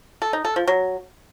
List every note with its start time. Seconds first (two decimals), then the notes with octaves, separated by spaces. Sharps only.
0.22 A4
0.33 D#4
0.45 A4
0.56 F3
0.67 F#3